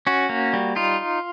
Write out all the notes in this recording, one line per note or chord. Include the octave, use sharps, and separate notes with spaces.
C#4 F#4
A#3
G3
D#4 F4